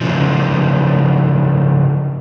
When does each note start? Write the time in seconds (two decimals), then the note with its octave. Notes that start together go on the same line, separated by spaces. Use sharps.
0.01 C#3 E3 F3